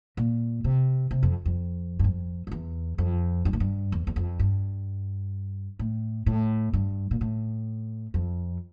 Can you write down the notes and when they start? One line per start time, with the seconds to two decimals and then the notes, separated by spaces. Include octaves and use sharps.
0.17 A#2
0.64 C3
1.11 C3
1.23 F2
1.45 F2
1.99 G2
2.04 F2
2.47 F2
2.51 E2
2.98 F2
3.45 G2
3.53 A2
3.60 G2
3.92 E2
4.07 E2
4.16 F2
4.39 G2
5.79 A2
6.26 A2
6.73 G2
7.11 A#2
7.21 A2
8.14 F2